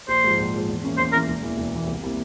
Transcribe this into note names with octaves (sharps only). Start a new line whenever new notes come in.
A#1 C5
G#2 F3
A#1
G#2 F3
E2
E3 A#3 C#4
E2 C5
E3 A#3 C#4 A#4
E1
E2 E3 A#3
E1
E2 E3 A#3
C2
C3 G3 A#3 E4